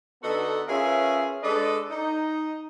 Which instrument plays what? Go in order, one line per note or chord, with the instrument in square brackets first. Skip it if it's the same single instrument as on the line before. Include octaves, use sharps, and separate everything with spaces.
[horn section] D3 B3 D#4 F#4 A4 B4
C#4 F4 G#4 A#4 B4 E5
G#3 D4 A4 B4 D5 D#5
D#4